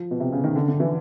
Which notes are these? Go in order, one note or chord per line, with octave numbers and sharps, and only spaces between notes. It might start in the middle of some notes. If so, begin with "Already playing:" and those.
Already playing: F3
B2
C3
C#3
D#3
D3
D3
E3